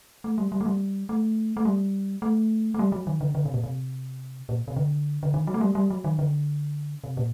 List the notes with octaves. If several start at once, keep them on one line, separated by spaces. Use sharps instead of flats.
A3
G3
G3
A3
G3
A3
A3
G3
A3
A3
G3
F#3
D#3
D3
D3
C3
A#2
C3
A#2
C3
D3
D3
D#3
F#3
A3
G3
G3
F#3
D#3
D3
C3
A#2